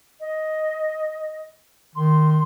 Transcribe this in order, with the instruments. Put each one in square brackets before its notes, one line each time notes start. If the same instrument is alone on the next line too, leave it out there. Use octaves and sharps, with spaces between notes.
[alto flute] D#5
[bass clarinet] D#3 [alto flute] C6